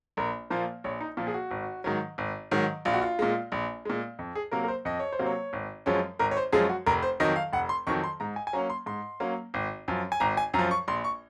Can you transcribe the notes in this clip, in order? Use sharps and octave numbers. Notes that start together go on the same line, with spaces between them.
A#1 A#4
A#2 F3 A#3 C5
A#1 C#5
D#4
A#2 F3 A#3 F4
G#4
F#4
G#1
G#2 D#3 F#3
G#1
G#2 D#3 F#3
A#1 F4
F#4
F4
A#2 G#3
A#1
A#2 G#3
F2
G#4
C3 F#3 A#3 A#4
A#4
C5
F2 D#5
C#5
C5
C3 F#3 A#3
C#5
G#1
F#2 F3 G#3 C#4
G#1 A#4
C#5
C5
F#2 F3 G#3 C#4 G#4
F#4
F1 A#4
C5
F2 D#3 F#3 D#5
F5
F1 F#5
C6
F2 D#3 F#3 C#6
C6
G#2 A#5
G#5
G#5
F#3 A#3 C#4 A#5
C6
G#2 C6
F#3 A#3 C#4
G#1
F#2 F3
G#5
G#1 A#5
G#5
F#2 A#5
F3
C#6
A#1 C6
C#6